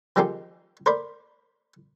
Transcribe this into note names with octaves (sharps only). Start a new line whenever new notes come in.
D#3 F3 G#3 C4 D#4 G4
A#4 C5 D5 B5